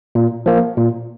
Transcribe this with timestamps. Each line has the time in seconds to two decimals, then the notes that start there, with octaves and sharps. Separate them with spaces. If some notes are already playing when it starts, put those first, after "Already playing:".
0.15 A#2
0.46 F3 A#3
0.77 A#2